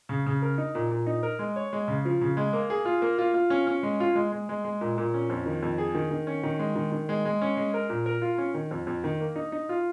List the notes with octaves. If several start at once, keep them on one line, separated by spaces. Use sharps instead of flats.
C#3
C#3
A#4
D#4
A#2
A#2
D#4
A#4
G#3
C#5
G#3
C#3
F3
C#3
G#3
A#3
G#4
F4
A#3
F4
F4
C#4
C#4
G#3
F4
G#3
G#3
G#3
G#3
A#2
A#2
C#4
F2
D#3
F2
G#4
D#3
D#3
C#4
D#3
G#3
D#3
D#3
G#3
G#3
C#4
G#3
A#4
A#2
A#4
F4
C#4
D#3
F2
F2
D#3
A#3
D#4
D#4
F4